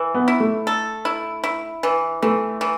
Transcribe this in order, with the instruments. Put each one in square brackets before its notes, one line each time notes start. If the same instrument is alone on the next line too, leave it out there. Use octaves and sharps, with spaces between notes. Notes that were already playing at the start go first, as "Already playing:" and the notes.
Already playing: [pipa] E3
[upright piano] B3
[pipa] E4
[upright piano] A3
[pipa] A4
E4
E4
E3
[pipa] E3 [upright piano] A3
[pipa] E3